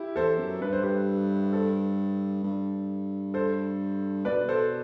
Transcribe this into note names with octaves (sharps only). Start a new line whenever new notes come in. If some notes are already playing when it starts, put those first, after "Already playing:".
Already playing: E4 G4
E2 A4 C5
F#2
G2 B4
C5
G4 B4
A4 C5
G2
A4 C5
B2 B4 D5
A4 C5